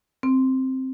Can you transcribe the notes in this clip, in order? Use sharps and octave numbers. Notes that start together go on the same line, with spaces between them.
C4